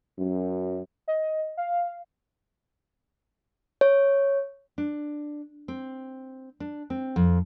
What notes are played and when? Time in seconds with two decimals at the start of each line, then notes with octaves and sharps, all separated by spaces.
0.17 F#2
1.08 D#5
1.57 F5
3.81 C#5
4.78 D4
5.68 C4
6.60 D4
6.90 C4
7.16 F2